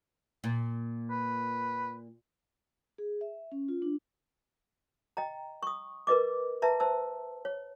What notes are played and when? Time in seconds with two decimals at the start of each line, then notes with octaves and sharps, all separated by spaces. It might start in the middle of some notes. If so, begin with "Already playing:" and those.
0.44 A#2
1.11 B4
2.98 G#4
3.21 E5
3.52 C#4
3.68 F4
3.82 D4
5.17 D#5 G5 A#5
5.63 C#6 D#6
6.07 A#4 B4 D#5 D6
6.62 B4 E5 A5 A#5
6.80 C5 A5 E6
7.45 C#5